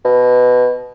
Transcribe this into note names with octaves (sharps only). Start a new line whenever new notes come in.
B2